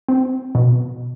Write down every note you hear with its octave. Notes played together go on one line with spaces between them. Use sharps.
C4
B2